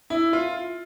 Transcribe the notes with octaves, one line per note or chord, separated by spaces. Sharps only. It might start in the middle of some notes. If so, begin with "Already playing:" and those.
E4
F4